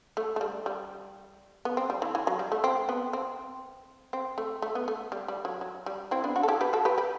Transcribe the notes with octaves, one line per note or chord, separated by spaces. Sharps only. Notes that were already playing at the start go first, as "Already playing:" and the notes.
A3
A3
G3
G3
B3
C4
G3
E3
E3
F#3
G3
A3
C4
B3
C4
C4
A3
A3
B3
A3
G3
G3
F#3
F#3
G3
C4 E4
B3 D4
D4 F#4
A4
E4 G4
G4 B4
F#4 A4
G4 B4
G4 B4